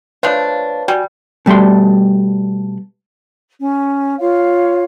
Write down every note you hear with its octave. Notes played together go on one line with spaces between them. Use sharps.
F3 A3 D4 B4 C#5 F5
G3 F#4 G#5
B2 G3 A3 D5 C6
C#4
F4 C#5 F5